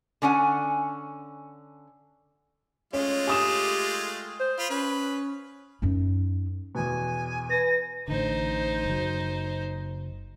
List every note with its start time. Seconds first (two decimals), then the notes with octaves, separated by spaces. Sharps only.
0.22 D3 C#4 F#5 G#5
2.93 G#3 A3 C#4 F4
3.27 G4 G#5 D#6 E7
4.40 C5
4.59 F4 B5
4.70 C#4 B4
5.82 F#2 D#4
6.75 E2 B2 G#5
7.50 B4 A#6
8.08 A1 D3 D#4 C5
8.86 F#1 F#3